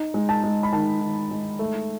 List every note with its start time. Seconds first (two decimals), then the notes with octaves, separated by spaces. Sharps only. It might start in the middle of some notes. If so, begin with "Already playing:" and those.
Already playing: D#4
0.14 G#3
0.29 A5
0.44 G#3
0.63 B5
0.73 D#3 A5
1.01 D#3
1.31 G#3
1.59 A3